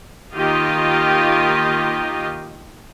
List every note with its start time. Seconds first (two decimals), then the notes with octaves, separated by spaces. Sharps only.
0.35 D#3 A#3 F4 G4 D#5 F5